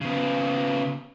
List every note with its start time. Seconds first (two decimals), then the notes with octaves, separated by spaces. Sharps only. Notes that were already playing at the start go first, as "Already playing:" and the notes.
0.01 C#3 B3